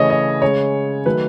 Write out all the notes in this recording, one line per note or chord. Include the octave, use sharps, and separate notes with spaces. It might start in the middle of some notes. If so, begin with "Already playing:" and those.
Already playing: C#3 E3 A3 C#5 D#5
D#5
C#3 G#3 C#5
D#3 F#3 A3 B4